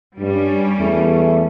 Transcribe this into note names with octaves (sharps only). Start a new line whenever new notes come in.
G2 G3 C#4
E2 A3